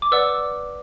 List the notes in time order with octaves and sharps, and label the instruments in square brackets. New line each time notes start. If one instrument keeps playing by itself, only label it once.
[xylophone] D6
B4 D5 F#5 E6